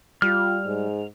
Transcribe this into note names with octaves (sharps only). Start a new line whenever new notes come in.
G3 F4 F6
G#2